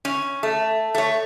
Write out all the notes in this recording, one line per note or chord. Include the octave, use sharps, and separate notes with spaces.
C#4
A3
A3 C#5